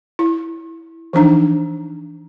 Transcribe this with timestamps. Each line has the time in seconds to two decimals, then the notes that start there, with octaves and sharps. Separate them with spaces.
0.19 E4
1.13 E3 F3 D4 D#4